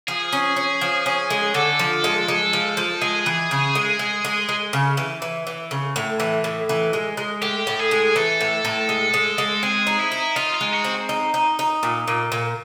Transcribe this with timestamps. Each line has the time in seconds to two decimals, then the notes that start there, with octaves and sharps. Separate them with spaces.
0.08 F3 G#4
0.32 C#4
0.57 C#4
0.81 F3
1.06 C#4
1.30 G#3
1.54 D3 A4
1.79 F3
2.04 G#3
2.28 G#3
2.53 F3
2.77 F3
3.02 G#3 G#4
3.26 E3
3.51 C#3
3.75 G#3
3.99 G#3
4.25 G#3
4.49 G#3
4.73 C#3
4.97 E3
5.22 E3
5.47 E3
5.71 C#3
5.96 A2
6.20 E3
6.44 A2
6.69 E3
6.93 G#3
7.17 G#3
7.42 A2 G4
7.67 A2
7.79 G#4
7.91 G#3
8.16 E3 A4
8.41 A2
8.65 A2
8.89 G#3
9.14 G#3
9.38 G#3
9.63 C4 G#4
9.87 D#4
9.99 E4
10.12 D#4
10.36 D#4 F4
10.54 F4
10.61 G#3
10.73 F#4
10.84 C4
11.09 D#4
11.34 D#4
11.59 D#4
11.83 A#2
12.07 A#2
12.32 A#2